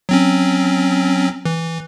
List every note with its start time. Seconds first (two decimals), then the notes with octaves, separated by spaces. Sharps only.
0.09 F#3 C4 C#4
1.45 E3